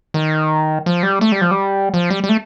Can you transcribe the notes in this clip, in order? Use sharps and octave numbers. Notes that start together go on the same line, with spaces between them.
D#3
F3
G3
A3
G3
F3
G3
F3
G3
G3
A3